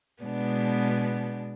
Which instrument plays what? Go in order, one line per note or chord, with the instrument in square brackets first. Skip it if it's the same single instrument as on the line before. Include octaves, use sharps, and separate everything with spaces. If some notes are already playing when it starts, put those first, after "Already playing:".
[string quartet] B2 G#3 B3 D4